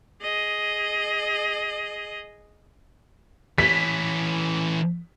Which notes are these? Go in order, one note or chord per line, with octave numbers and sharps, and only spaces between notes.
G#4 D#5
E3 C#4 B6